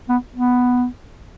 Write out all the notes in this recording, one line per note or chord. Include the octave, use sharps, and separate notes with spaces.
B3
B3